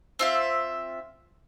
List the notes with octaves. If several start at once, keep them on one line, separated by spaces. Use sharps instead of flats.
C4 F4 E5